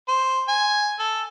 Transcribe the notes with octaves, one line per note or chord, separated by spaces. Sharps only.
C5
G#5
A4